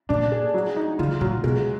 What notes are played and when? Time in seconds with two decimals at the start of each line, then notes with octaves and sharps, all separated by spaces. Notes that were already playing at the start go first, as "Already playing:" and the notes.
0.09 A#2 D4
0.32 G#4
0.54 F#3
0.76 D#4
0.99 D3 F4
1.21 A#2 F#3
1.44 B2 G#3